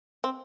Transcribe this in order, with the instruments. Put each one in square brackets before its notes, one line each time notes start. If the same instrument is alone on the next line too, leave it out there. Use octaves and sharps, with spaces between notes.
[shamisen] C4